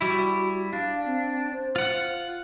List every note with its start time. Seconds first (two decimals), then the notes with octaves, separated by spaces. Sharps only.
0.01 G3 E4 F#4
0.73 D4 F5
1.06 C4
1.53 C5
1.76 F4 F#5